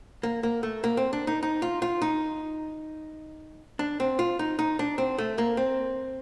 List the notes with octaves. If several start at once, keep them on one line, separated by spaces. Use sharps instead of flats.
A#3
A#3
A3
A#3
C4
D4
D#4
D#4
F4
F4
D#4
D4
C4
F4
D#4
D#4
D4
C4
A3
A#3
C4